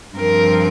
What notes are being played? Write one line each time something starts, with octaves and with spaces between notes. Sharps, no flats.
G2 F3 C4 A#4